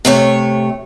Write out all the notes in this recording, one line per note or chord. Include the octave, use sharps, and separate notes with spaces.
C3 A3 C#5